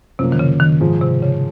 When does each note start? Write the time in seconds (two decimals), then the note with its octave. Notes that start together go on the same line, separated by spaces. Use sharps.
0.19 F#2 C3 F3 A#3
0.32 D#3
0.39 C#3
0.60 D#3
0.80 G#2 F3 G#3
1.02 C3
1.22 C#3